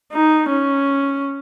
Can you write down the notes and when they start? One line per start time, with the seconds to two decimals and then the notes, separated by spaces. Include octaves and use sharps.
0.13 D#4
0.49 C#4